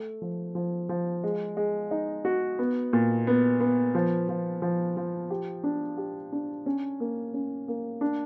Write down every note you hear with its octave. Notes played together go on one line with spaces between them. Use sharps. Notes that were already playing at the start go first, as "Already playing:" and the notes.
Already playing: A3
F3
F3
F3
G#3
G#3
D#4
F#4
B3
A#2
B3
B3
F3
F3
F3
F3
G4
D4
G4
D4
C#4
A#3
C#4
A#3
D4